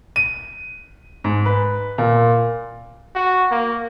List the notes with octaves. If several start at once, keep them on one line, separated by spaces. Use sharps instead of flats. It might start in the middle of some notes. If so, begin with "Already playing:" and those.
D#7
G#2
B4
A#2
F#4
A#3